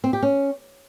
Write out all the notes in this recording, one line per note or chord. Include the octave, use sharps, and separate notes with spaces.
C4
G4
C#4